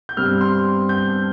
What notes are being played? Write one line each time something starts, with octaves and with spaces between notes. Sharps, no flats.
G6
G2 G3 C4 F6
C6
G6